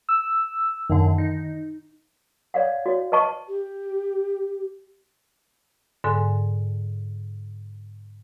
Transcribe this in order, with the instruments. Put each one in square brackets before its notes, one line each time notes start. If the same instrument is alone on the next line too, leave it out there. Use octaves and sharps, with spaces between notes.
[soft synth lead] E6
[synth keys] F#2 A#2 D3 [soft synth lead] D#3
[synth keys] D#4
[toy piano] C#5 D5 F5 F#5
F#4 C#5
B4 D#5 A5 C#6
[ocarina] G4
[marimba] G#2 D3 A4 G#5